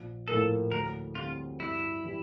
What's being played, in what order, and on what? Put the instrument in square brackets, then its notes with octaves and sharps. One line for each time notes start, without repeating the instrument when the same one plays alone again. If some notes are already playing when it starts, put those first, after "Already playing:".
Already playing: [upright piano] A#1
[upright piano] A2 F3 A#3 [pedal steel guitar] A4
[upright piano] D2 [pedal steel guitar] A#4
[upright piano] D3 G3 C4 [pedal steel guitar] F4
[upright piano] G2 [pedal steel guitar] E4
[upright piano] E3 G3